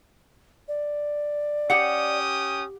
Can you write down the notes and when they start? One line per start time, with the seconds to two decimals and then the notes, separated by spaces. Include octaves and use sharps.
0.68 D5
1.70 C#4 G4 F#5 G5 D#6